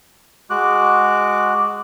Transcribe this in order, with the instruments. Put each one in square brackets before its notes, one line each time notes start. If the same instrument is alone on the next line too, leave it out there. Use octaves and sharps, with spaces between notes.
[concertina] G#3 F#4 D6 F#6